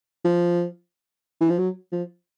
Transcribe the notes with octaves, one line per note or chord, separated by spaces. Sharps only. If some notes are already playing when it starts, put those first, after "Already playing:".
F3
E3
F3
F#3
F3